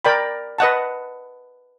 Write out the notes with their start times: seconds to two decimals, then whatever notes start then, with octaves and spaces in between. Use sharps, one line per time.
0.05 A#4 D5 G5 B5
0.58 B4 D#5 F#5 A5